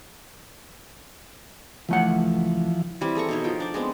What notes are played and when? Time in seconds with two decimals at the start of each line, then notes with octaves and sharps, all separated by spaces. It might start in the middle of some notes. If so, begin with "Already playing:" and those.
1.89 C#2 E3 F3 A3 F#5
3.01 E3 G3 C4
3.15 G#4 A4 A#5 C#6
3.29 B2 D#4 C#5
3.44 F3 G5
3.60 D4 D5
3.74 G#3 B3 C4